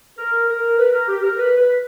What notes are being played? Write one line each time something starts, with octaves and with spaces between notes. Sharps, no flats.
A#4
A#4
B4
A#4
G4
A#4
B4
B4